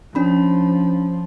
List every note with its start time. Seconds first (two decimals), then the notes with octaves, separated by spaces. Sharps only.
0.15 F3 C#4 D4 B5